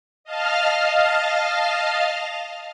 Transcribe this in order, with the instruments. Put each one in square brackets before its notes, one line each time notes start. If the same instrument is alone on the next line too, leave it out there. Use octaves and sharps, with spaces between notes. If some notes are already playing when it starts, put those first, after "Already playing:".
[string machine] D#5 F5 A5 F6